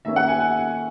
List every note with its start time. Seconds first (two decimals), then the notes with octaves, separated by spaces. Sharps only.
0.05 D#3 A#3 C#4 E5
0.16 F#5
0.28 G#5
0.40 G#5